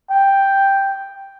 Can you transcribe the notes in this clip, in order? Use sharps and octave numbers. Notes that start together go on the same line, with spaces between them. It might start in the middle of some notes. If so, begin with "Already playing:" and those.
G5